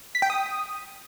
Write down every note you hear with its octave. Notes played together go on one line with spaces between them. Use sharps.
B6
G5
D#6